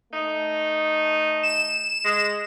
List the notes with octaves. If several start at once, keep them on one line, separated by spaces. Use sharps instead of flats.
A3 D#4
E7
G#3